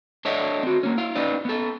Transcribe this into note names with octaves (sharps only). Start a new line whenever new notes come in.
D4 A4 C#5 D#5 E5
C4 F#4
A#3 C#4
E4 F5
C#4 D#4 B4 D5
B3 A4